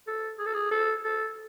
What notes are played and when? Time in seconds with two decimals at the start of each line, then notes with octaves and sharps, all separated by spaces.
0.07 A4
0.39 G#4
0.46 A4
0.54 G#4
0.71 A4
1.04 A4